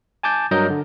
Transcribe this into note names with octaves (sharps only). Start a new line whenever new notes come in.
G#5 A5 D6 G6 A6
G2 F#3 A#4 D#5 F6 G6
D3